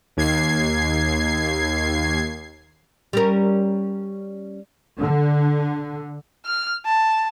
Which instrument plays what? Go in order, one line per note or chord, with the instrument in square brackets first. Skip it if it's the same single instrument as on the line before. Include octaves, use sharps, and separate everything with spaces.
[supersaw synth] D#2 G#6 C7
[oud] G3 C#4 A#4
[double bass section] D3
[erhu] F6
A5